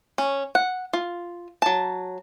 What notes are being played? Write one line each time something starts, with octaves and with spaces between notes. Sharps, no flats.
C#4
F#5
F4
F#3 A5